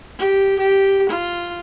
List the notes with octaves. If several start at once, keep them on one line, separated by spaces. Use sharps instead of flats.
G4
G4
F4